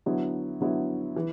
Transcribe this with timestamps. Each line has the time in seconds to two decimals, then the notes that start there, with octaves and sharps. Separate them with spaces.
0.06 D3 F#3 B3 E4
0.61 D3 F#3 B3 E4
1.16 E3